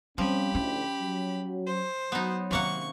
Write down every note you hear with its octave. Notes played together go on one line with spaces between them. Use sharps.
F3 G3 C4 C#4 G4 B5
D2 A2 C#4
F#3
C5
F#3 B3 D#4
C3 D#3 A#3 C#4 F#5 C#6